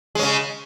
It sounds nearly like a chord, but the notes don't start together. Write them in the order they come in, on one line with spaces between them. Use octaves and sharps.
G#3 C#4 C#3